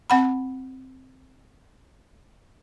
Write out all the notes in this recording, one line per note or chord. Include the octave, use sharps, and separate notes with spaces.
C4 F#5 B5